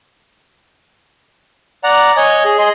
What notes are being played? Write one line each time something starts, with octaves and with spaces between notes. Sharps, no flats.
D5 F#5 A#5
C#5 D#5 G#5
G#4
G#4 D#5 C6